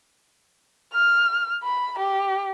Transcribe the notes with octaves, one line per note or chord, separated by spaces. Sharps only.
F6
B5
G4